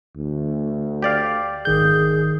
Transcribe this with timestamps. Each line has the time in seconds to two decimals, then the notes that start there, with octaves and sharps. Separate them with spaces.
0.17 D2
1.02 G4 D5 F5
1.65 G#1 D#3 G#4 G6